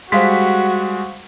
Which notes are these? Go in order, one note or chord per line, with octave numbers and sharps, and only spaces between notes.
G3 G#3 F#4 C5 F5 C6 B6